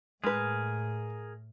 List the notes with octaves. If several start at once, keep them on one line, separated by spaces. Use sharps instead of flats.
A2 G#3 G#4 A#4 B4